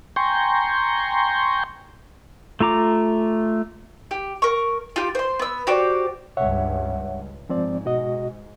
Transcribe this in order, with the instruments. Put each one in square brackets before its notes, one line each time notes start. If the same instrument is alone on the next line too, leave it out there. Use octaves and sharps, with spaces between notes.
[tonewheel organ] G5 G#5 A#5 C6 C#6 G6
[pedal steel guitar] A3 F4 A#5 D6
[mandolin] G4
A#4 C#6
F4 G4
C5 C6
B3 E6
F#4 G4 C5 D5
[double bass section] C#2 G2 [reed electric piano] C#5 E5 F#5
[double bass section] G#2 [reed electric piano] F3 C4 D5
[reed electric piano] B2 F#4 D#5